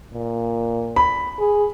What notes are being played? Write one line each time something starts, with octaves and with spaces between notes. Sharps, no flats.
A#2
B5
G#4